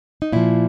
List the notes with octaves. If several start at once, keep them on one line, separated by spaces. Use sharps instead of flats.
D#4
A#2 F3 E4